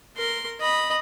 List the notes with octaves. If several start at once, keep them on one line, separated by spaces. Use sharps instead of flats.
A#4 C6
D#5 B5